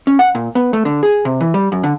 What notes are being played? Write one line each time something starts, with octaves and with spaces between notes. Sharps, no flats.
C#4
F#5
A#2
B3
A3
D3
G#4
C3
E3
G3
F#2
D3